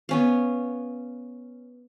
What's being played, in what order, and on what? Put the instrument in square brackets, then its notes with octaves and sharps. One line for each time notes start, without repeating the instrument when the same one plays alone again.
[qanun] B3 C#4 F5